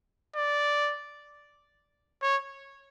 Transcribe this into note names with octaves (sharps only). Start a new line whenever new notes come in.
D5
C#5